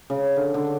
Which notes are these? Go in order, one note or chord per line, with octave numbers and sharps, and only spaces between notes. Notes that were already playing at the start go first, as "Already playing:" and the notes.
C#3
D3
D3